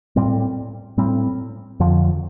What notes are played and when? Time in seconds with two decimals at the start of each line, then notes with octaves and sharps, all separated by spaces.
0.16 A2 G3 C4
0.98 A2 G3 C4
1.80 F2 D3 F3